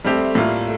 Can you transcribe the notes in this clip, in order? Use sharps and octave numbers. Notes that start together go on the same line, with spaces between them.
G3 A3 C4 G4
A2 G3 A#3 F4